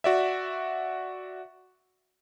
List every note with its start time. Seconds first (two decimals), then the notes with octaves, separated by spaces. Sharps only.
0.04 F#4 D5 E5